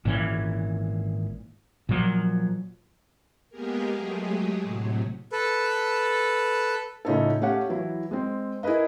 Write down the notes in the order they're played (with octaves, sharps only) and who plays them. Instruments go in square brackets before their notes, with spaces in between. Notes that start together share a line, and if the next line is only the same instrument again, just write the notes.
[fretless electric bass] G#1 A#2 E3 C#4
A#2 F3 F#3
[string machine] G#3 A#3 B3 G4 G#4 A#4
F#3 G#3 A3 G4 G#4
A2 C3 F#3
[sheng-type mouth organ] A4 B4
[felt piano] A2 C#3 C#4 D#4 F4 A4
A3 C#4 G4 F5 F#5
E3 F#3 E4
G#3 C4
E4 G#4 A#4 B4 D#5